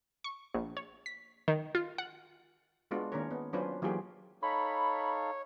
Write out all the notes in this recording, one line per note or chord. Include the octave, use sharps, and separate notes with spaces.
C#6
A#1
C#5
B6
D#3
F4
F#5
G#3 B3 D4 F4 F#4
D#3 A#3 C#4 D4 A#4 C#5
B3
F#3 C#4 D4 F4 B4 C5
E3 F#3 A#3 F4 G4 G#4
D#4 A4 C#5 F5 B5